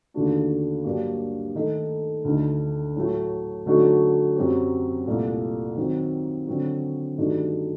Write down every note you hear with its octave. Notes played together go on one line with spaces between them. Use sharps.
D#2 D3 A3 D4 F#4
G2 F#3 A#3 D4 G4
D#3 A3 D#4 A4
D2 D3 A3 D#4
A2 F#3 A3
D3 F#3 A3 D#4 F#4
F#2 F#3 C4 G4
C2 A#2 A3
D#3 F#3 C4
D3 F#3 C4 F#4
G2 D#3 A3 D#4 F#4